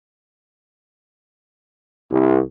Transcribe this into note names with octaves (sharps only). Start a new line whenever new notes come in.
C2